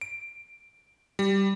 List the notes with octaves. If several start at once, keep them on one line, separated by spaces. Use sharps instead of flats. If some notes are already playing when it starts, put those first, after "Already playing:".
D7
G3